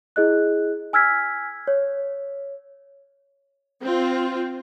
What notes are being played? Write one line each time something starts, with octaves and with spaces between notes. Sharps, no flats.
E4 G#4 D#5 F#6
G#5 E6 F6 G#6 B6
C#5
C4 F4